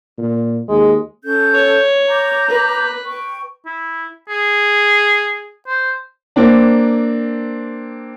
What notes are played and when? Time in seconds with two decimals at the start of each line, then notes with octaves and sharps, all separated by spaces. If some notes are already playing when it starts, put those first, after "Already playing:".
0.18 A#2
0.69 D#2 G#3
1.24 C#4 A4 G6
1.53 C#5
2.08 A#5 D6 G6
2.48 B4
3.05 G5 C#6
3.66 E4
4.29 G#4
5.68 C5
6.36 A#3 C4 D4